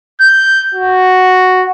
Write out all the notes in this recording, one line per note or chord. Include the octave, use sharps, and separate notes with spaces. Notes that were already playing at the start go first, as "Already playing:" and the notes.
G6
F#4